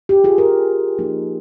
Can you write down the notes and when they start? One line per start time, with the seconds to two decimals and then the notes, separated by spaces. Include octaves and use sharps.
0.09 G4
0.24 F4 G#4
0.38 G4 A#4
0.98 F3 A#3 D#4